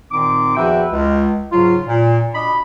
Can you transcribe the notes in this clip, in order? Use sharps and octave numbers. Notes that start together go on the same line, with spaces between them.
A#2 D#3 C4 D#4 D6
E2 F3 F#4 B4 E5 G5
C#2
G#2 C#3 F#3 F4
A#2
B2 D4 D#5 B5